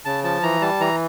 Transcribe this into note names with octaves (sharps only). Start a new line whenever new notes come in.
C#3 A5
F3 A5
E3 A#5
G3 A5
E3 A#5